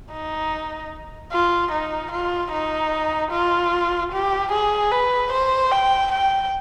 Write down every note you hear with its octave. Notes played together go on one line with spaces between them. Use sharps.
D#4
F4
D#4
F4
D#4
F4
G4
G#4
B4
C5
G5
G5